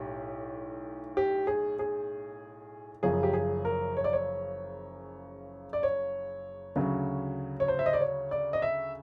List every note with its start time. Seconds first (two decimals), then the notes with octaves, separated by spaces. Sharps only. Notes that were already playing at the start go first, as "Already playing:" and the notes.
Already playing: B1 A2 G4
1.17 G4
1.47 G#4
1.79 G#4
3.03 F#1 F#2 C#3 F3 G#4
3.23 G4
3.33 G#4
3.65 A#4
3.97 C#5
4.04 D5
4.13 C#5
5.73 D5
5.83 C#5
6.76 D2 C#3 F#3
7.60 C#5
7.68 C5
7.79 E5
7.86 D#5
7.93 D5
8.01 C#5
8.31 D5
8.53 D#5
8.62 E5